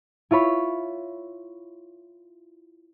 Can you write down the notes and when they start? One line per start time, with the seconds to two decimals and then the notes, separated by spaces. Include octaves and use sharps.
0.31 E4 F4 C#5 B5